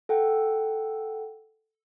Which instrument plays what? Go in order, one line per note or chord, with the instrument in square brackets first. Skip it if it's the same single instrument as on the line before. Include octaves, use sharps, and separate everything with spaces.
[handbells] A4 F#5 G5